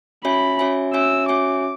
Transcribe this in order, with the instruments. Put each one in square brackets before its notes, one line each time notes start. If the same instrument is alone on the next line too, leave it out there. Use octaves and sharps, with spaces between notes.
[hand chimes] C#4 F#4 C#5 E5 G#5 [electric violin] B5
[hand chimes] C#4 F#4 C#5 E5 G#5
[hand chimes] C#4 F#4 C#5 E5 G#5 [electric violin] E6
[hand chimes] C#4 F#4 C#5 E5 G#5 [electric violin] D6